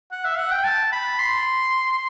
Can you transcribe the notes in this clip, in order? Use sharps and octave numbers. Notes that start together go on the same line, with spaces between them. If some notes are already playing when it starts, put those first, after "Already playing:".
F#5
E5
F#5
G5
A5
B5
C6